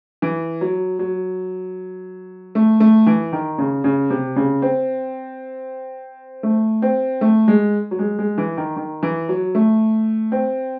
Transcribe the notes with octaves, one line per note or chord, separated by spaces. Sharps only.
E3
F#3
F#3
A3
A3
E3
D#3
C#3
C#3
C3
C#3
C4
A3
C4
A3
G#3
F#3
G#3
G#3
E3
D#3
D#3
E3
F#3
A3
C4